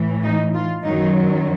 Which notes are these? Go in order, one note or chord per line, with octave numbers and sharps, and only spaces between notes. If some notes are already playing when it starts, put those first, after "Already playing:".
Already playing: A2 E3
D#4
F4
F#2 D#3 F#3 D#4